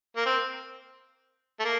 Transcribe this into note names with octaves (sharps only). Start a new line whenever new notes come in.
A#3
C4
A3
A#3